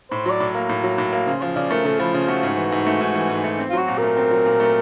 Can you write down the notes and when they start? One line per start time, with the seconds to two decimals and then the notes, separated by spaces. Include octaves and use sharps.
0.11 A2 C5
0.26 F#3 D5
0.40 A2
0.54 A#3
0.69 A2
0.84 F#3
0.98 A2
1.13 A#3
1.27 C#3 C5
1.42 F3 F5
1.56 C#3 D5
1.71 A3 A#4
1.85 C#3 A4
2.00 F3 E4
2.14 C#3 F4
2.28 A3 F#4
2.43 G#2
2.57 E3
2.72 G#2
2.87 A3
3.01 G#2
3.15 E3
3.30 G#2
3.44 A3
3.59 C4
3.69 F4
3.73 F#3 F#4
3.88 A#2
3.98 A3 A#4
4.17 C4
4.31 F#3
4.46 A#2
4.60 A3